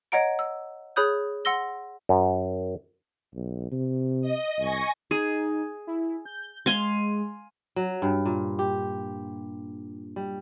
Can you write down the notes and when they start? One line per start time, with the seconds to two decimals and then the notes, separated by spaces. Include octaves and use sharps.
0.12 C#5 D#5 F#5 A#5 D7
0.39 E6
0.96 G#4 C#5 B5 D#6 F#6 G6
1.45 F#5 C6 E6 A#6 G7
2.09 F#2
3.35 B1
3.71 C3
4.21 D#5
4.59 C2 G#5 C#6 A#6
5.11 D#4 G#4
5.87 E4
6.26 G6
6.66 G#3 F5 G#5 C6
7.76 F#3
8.02 G2
8.26 A#2
8.59 G4
10.16 G3